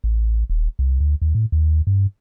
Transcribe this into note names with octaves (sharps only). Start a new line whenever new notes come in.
A1
D#1
C2
D2
D#2
A2
D#2
G2